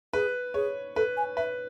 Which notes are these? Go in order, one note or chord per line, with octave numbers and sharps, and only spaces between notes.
G#4 B4
G#4 C#5
A4 B4
G#5
B4 E5